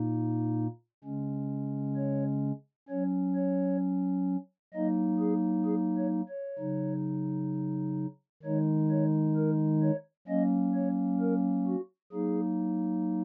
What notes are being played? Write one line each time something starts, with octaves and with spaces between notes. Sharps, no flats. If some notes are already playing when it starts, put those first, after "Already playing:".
Already playing: A#2 A#3 D#4
C#3 G#3 C#4
C#5
F#3 C#4 C#5
C#5
F#3 A#3 D#4 D#5
G#4
G#4
C#5
C#5
C#3 F#3 D#4
D#3 G#3 D#4 C#5
C#5
A#4
C#5
F#3 A#3 C#4 D#5
C#5
A#4
F#4
F#3 A#3 D#4 G#4